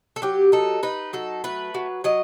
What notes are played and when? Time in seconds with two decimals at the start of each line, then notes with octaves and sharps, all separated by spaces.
0.16 A4
0.22 F#3 G4
0.52 D#4 A4
0.83 D#4 B4
1.13 F#3 A4
1.44 A3 B4
1.75 F#3
2.04 F#3 D#5